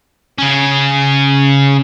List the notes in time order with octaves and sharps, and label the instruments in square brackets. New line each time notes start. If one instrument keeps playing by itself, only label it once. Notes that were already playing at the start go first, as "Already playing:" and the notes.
[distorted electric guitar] C#3 C#4